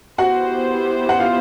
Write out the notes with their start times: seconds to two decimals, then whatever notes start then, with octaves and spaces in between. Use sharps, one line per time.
0.18 B3 E4 F#4 G4 C5 F#5
1.09 F#5
1.20 F4 F5